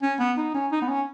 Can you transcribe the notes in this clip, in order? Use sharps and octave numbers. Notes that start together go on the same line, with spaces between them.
C#4
B3
D#4
C#4
D#4
B3
C#4